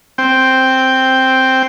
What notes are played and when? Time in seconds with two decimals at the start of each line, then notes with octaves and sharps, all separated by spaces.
0.18 C4 G5